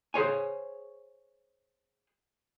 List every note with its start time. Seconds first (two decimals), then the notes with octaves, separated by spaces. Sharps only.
0.14 G#4 C5 C#5 G#5